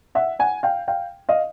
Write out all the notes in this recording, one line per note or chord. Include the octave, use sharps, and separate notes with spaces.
E5 F#5
F#5 G#5
F5 G5
F5 G5
D#5 F5